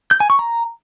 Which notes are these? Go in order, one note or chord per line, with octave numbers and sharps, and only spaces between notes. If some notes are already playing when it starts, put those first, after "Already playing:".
G6
G#5
C#6
A#5